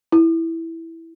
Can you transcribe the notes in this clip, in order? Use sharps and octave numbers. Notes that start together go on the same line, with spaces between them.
E4